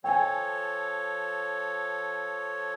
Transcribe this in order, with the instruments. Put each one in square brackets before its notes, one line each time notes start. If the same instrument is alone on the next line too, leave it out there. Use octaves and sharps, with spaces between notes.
[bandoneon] F3 A4 C#5 [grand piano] G5 G#5